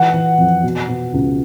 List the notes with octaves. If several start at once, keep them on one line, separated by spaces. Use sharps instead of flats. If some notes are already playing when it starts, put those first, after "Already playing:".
Already playing: E3 F#5
E3
F2
B2
B2
C#2